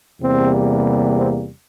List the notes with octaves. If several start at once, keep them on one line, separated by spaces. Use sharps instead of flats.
E2 C3 G3 A#3 C4
C4